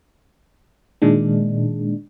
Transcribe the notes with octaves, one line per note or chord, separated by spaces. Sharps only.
A#2 D#3 G#3 D4